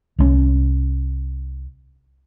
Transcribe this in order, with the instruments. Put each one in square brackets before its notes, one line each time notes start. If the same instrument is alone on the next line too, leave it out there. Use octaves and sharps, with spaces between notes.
[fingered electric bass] C2 G#3 C#4